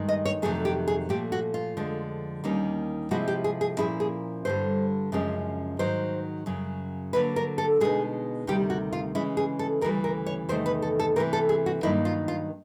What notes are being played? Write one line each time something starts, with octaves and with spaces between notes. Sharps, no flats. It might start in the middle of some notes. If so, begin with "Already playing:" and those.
Already playing: G2 D#3 G#3
D#5
C#5
F2 C3 D#3 F#3 A3 G#4
G4
G#4
A#2 F3 A3 G4
F#4
F4
F2 D3 F3 G#3
D#2 D#3 G3 A#3 C#4
C3 F3 G#3 C4 E4 F#4
G4
G#4
G#4
A#2 F3 A#3 C#4 E4 G#4
G#4
G2 D3 G3 C5
F#2 C#3 F3 G#3 C#4
G#2 D#3 F#3 C5
F#2 C#3 F#3
D3 F#3 A#3 B4
A#4
A4
B2 G#3 B3 D#4 G#4
D2 C3 D#3 G3 G4
F#4
F4
C#3 E3 G#3 C#4 E4
G#4
A4
D2 C#3 E3 G3 A#4
A#4
C#5
E2 C3 D#3 A3 C5
B4
A4
A4
C3 E3 A3 A#4
A4
G#4
F#4
G2 D#3 F#3 A#3 D#4 E4
F4
F4